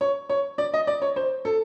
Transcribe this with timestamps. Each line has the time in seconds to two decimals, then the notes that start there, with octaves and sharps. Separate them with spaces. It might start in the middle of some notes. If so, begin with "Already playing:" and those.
0.01 C#5
0.29 C#5
0.58 D5
0.74 D#5
0.87 D5
1.02 C#5
1.16 C5
1.45 A4